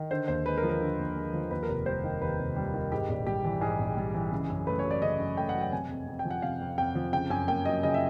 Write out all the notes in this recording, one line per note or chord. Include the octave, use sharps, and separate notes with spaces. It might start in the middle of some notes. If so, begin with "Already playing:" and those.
Already playing: D#3
D3 C5
D#2 C5
G#3 B4
A#4
F3
A#4
D3
D#2
G#3
F3
D#2 B4
A#4
F1
G3 C5
D#3
D#2 B4
F1
G3
D#3
G#2 G4
A#1
G3 G4
E3
G#2 G#4
A#1
G3
E3
C#3
F#2
A3 B4
C#5
F#3
D5
C#3 D#5
F#2
A3 G5
F#5
F#3
G5
C3 G#5
F2
F2
G5
F3
F#5
C3 F5
F2
F2 G5
F3
C#3 G5
F#2 G#5
A#3 G5
F#3 D#5
C#3 D#5
E5